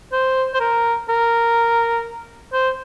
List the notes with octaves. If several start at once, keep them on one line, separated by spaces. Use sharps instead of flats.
C5
C5
A#4
A#4
C5